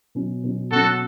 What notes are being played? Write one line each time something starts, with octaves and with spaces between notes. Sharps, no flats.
B2 F#3 C#4
B2 F#3 C#4
B2 F#3 C#4 F#4 A4